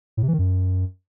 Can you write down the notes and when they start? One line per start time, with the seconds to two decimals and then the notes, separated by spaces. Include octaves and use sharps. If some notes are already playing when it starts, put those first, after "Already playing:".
0.17 A2
0.23 C3
0.28 E3
0.33 D#3
0.39 F#2